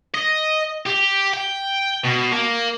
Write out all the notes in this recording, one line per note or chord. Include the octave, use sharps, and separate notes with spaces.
D#5
G4
G5
B2
A#3